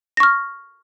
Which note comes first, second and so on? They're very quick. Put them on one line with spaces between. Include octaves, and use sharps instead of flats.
A#6 C#6 F6